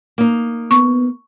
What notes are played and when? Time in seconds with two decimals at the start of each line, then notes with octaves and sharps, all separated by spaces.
0.18 A#3 D#4
0.71 B3 C#6